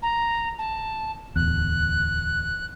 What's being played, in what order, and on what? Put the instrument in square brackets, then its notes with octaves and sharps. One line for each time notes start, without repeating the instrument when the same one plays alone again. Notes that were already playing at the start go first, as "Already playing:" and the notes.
[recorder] A#5
A5
[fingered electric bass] D1 E2 [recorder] F#6